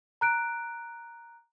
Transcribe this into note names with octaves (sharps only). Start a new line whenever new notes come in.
A#5 F#6 D7